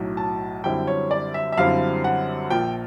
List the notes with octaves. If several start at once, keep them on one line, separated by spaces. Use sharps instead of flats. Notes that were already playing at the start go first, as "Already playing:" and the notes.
Already playing: B1 A2 F#3
A5
F#2 D3 G3 C4 E4 G5
C#5
D5
E5
E5
F#2 D3 G3 C4 E4 F5
F#5
A#1 A#2 F3 G5